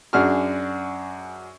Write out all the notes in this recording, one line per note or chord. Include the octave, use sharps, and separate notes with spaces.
F#2 D4 F#4 G#4 F6